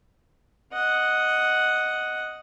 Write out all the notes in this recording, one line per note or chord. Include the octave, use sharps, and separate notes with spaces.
D#5 F#5